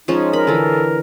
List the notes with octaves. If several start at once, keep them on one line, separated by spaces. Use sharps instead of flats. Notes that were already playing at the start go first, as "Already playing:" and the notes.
F3 G#3 C#4 D#4
A#4 B5
D3 E3 A4